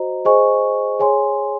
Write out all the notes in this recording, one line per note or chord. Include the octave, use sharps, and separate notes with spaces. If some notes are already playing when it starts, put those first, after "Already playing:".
Already playing: F#4 C5 D#5 A#5
G#4 C5 D#5 G#5 C#6
G#4 C#5 G#5 C6